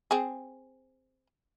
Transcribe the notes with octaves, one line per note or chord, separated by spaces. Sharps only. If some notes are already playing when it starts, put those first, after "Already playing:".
C4 G#4